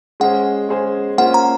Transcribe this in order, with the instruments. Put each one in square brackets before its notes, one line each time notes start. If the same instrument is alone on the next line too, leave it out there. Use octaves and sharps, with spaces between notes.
[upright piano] G#3 C#4 G#4 C5 [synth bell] F#5
[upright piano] G#3 C#4 G#4 C5
[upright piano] A#3 C#4 F4 C5 [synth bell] F#5
[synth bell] A#5